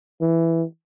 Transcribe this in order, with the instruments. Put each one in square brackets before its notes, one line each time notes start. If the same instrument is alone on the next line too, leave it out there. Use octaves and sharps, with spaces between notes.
[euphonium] E3